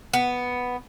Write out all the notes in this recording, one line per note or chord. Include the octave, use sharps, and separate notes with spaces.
B3